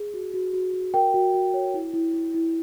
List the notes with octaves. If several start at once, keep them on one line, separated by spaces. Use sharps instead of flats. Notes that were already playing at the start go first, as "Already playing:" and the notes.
Already playing: G#4
F#4
F#4
F#4
F#4
A#4 G5
F#4
F#4
C#5
E4
E4
E4
E4